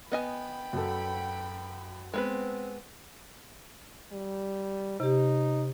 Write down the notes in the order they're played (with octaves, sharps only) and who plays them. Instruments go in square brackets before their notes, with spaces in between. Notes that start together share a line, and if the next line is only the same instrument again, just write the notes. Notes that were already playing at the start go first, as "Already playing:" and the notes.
[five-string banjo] B3 D#5 G#5 [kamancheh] G5 B5
[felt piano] F#2 F#3 A4
[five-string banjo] G#3 B3 B4 [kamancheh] C4
[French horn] G3
[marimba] C3 G4 [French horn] D#4